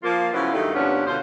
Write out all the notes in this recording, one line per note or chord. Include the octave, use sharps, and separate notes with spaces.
F3 A#3 F4
C#3 F3 F#3 B3 E4 F4
G2 D#3 F#3 A3 D#4 A4
D#2 B2 F3 B3 C#4 D4
B2 D3 F4 C5